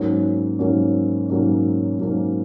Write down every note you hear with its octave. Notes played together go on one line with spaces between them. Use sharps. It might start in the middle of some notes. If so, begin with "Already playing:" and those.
Already playing: G#2 F#3 A#3 C#4
G#2 F#3 A#3 C#4
G#2 F#3 A#3 C#4
G#2 F#3 A#3 C#4